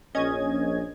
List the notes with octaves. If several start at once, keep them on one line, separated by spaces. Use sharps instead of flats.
A#1 C#4 D#5 G#6